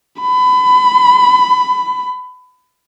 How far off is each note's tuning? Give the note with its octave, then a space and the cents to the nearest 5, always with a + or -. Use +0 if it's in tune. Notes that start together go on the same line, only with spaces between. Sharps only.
B5 +30